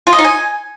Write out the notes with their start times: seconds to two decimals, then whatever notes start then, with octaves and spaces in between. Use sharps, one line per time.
0.07 F4
0.13 D#5
0.19 D#4
0.24 G#5